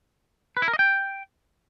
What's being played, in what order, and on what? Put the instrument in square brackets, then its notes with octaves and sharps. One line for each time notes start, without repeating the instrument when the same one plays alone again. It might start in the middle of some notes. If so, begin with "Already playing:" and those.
[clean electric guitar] B4
E4
A#4
D#5
G5